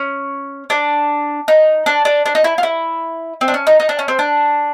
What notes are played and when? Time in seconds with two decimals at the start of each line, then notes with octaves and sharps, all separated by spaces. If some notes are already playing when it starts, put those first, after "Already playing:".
Already playing: C#4
0.70 D4
1.48 D#4
1.86 D4
2.05 D4
2.26 D4
2.35 D#4
2.44 E4
2.58 F4
2.63 E4
3.41 C4
3.48 D4
3.54 C#4
3.67 D#4
3.80 D#4
3.89 D4
3.99 C#4
4.08 C4
4.19 D4